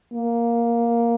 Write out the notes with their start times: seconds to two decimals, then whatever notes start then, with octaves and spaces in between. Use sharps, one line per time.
0.14 A#3